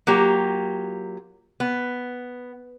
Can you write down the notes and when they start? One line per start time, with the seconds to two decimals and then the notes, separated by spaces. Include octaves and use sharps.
0.07 F#3 A#3 F4 G4
1.60 B3